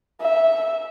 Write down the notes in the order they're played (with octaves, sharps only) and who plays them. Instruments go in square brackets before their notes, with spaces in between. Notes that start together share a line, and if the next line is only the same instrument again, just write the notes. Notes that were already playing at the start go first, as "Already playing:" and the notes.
[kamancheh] E5